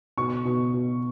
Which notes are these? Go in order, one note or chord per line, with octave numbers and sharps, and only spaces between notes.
B2 C#6
B2
B2